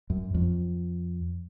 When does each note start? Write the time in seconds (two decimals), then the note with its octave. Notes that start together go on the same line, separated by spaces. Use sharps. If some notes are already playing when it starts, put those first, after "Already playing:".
0.10 F#2
0.34 F2